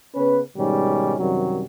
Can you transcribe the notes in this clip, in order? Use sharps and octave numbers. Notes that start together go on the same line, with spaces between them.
C#3 B3 C#4 B4
G#2 B2 D#3 G3 C#4 D#4
F#2 C3 D#3 F#3 G3